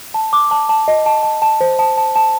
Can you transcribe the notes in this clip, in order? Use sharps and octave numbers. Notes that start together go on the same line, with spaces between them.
A5
D6
A5
A5
D#5
A5
A5
A5
C5
A5
A5
A5